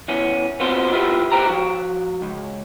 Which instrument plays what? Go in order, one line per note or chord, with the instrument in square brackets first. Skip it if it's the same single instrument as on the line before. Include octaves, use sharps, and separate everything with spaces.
[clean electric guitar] E2 E3 C#4
B3 C4 F4 F#4 C5
E4 F4 G4 B4
G4 B4 C5 G5 A#5
F3 F#4
C#2